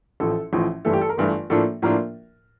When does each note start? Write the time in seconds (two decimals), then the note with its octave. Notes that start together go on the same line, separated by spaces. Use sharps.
0.20 A1 A2 F3 A4
0.53 A1 A2 F3
0.85 G1 G2 E3 A3 A4
0.93 G4
1.01 A4
1.09 A#4
1.17 G1 G2 E3 A3
1.50 A2 F3 A#3 D4 F4 A4
1.82 A2 F3 A#3 D4 F4 A#4